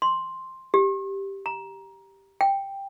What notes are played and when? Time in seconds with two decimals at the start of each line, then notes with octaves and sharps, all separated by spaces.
0.02 C6
0.74 G4
1.46 A#5
2.41 G5